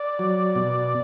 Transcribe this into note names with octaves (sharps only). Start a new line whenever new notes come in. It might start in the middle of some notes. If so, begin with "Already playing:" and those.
Already playing: D5
F#3
B2